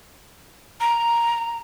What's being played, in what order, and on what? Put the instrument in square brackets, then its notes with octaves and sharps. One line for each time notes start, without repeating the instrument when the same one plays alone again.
[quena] A#5